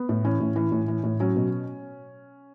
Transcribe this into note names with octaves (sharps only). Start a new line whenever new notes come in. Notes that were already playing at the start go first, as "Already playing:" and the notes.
Already playing: B3
A2
E3 C#4
A2
E3
A2
E3
A2
F#3 C#4
B2